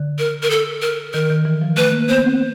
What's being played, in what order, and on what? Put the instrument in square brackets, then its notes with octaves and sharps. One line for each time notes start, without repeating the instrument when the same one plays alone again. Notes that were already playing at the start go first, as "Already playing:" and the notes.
Already playing: [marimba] D3
[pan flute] A#4
A#4
A4
A#4
[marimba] D#3 [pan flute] A#4
[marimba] D#3
E3
F3
[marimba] A3 [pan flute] B4
[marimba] A#3
[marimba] B3 [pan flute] C5
[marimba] C4